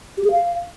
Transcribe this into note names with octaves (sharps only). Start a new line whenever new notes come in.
G4
G#4
F5